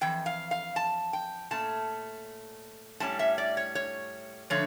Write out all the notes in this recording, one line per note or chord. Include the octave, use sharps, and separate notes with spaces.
F2 E3 G5
F5
F5
A5
G5
A#2 A3 C#4 A5
A2 G3 C#4 A5
E5
D5
C#5
C#5
D3 F3 A3 C#5